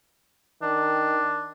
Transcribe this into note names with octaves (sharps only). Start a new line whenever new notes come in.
D#3 D4